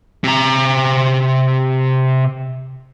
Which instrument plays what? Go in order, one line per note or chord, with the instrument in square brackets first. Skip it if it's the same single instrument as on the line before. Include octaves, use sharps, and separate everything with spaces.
[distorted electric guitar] C3 A#5